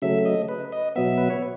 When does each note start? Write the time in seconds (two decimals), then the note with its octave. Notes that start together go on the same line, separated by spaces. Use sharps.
0.02 C#3 F#3 A3 E5
0.26 D#5
0.49 B4
0.72 D#5
0.96 B2 F#3 B3 E5
1.18 B4
1.30 C#5